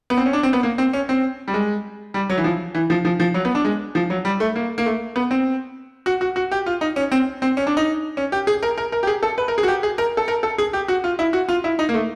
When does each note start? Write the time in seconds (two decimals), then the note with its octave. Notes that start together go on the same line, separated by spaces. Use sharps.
0.10 B3
0.17 C4
0.26 C#4
0.33 D4
0.43 C4
0.53 B3
0.63 A#3
0.78 C4
0.93 C#4
1.09 C4
1.48 G3
1.54 G#3
2.14 G3
2.30 F#3
2.38 E3
2.44 F3
2.75 E3
2.90 F3
3.05 F3
3.20 F3
3.34 F#3
3.45 B3
3.55 D4
3.65 G#3
3.95 F3
4.10 F#3
4.25 G3
4.40 A3
4.56 A#3
4.78 A#3
4.86 A3
5.16 B3
5.31 C4
6.06 F#4
6.21 F#4
6.36 F#4
6.51 G4
6.66 F4
6.81 D#4
6.96 C#4
7.12 C4
7.42 C4
7.57 C#4
7.67 D4
7.77 D#4
8.17 C#4
8.32 G4
8.47 G#4
8.63 A#4
8.78 A#4
8.92 A#4
9.03 G4
9.07 G#4
9.23 A4
9.38 B4
9.48 A#4
9.58 G#4
9.63 F#4
9.68 G4
9.83 G#4
9.98 A#4
10.17 A4
10.28 A#4
10.43 A4
10.58 G#4
10.73 G4
10.88 F#4
11.04 F4
11.19 E4
11.33 F#4
11.49 F4
11.64 E4
11.79 D#4
11.89 A#3
11.94 A3